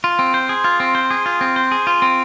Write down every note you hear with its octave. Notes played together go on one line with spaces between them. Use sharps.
F4
C4
C5
G#4
F4
C4
C5
G#4
F4
C4
C5
G#4
F4
C4